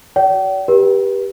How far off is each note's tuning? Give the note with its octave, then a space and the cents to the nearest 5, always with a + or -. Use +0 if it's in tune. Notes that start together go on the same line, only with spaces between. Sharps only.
F#4 +0 D5 -40 G5 -45
G4 +10 B4 -35